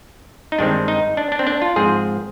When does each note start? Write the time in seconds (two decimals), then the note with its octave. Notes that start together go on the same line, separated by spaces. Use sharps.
0.52 D#4
0.59 G2 D#3 G#3 C4 D4
0.88 D#4
1.17 D4
1.32 D4
1.39 C4
1.47 D4
1.62 F4
1.76 G#2 F3 C4 G#4